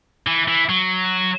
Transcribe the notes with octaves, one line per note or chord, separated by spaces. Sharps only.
E3
E3
F#3